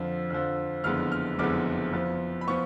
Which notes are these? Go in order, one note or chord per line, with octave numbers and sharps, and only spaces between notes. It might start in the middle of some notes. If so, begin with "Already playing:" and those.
Already playing: F2 D3 F3
F2 D3 F3
F#1 F2 D3 G#3 B3 F6
F6
F#1 F2 D3 G#3 B3 D6
F2 F3 B3
B5
F3 B3 C#6